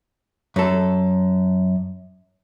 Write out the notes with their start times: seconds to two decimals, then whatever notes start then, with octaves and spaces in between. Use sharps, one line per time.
0.56 F#2 A4